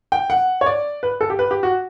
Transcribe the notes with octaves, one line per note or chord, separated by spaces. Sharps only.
G5
F#5
C#5
D5
B4
A4
G4
B4
G4
F#4